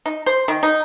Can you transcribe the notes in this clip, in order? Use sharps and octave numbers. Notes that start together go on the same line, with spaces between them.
D#4
C5
D#3
D#4